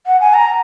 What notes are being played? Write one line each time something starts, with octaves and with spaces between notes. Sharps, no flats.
F#5
G#5
A#5